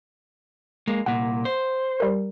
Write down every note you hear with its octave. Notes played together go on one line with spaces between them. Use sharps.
G#3 A#3
C2 A#2 F#5
C5
G3 A#4